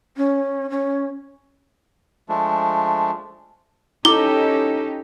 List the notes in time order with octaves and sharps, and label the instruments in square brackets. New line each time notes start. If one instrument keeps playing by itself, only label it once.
[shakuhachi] C#4
C#4
[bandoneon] F3 G#3 A3 D4
[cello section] C#4 D#4 G4 [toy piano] E4 D6 [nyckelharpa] A4 [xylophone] G7